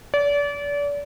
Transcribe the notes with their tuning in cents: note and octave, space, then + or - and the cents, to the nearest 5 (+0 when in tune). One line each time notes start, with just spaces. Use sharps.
D5 -35